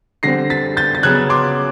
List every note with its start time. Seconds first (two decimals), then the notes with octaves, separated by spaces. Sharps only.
0.23 D3 G3 C4 A#6 C7
0.50 A6 B6
0.77 G6 A6
0.95 A6
1.03 C#3 F#3 B3 F#6 G#6
1.30 C6 D6